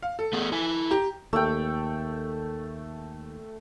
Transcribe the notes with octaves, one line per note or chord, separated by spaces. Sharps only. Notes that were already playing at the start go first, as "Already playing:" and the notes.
F5
A4
A3 B3 G#4
E4 G#5
G4 A#5
D#2 A3 G5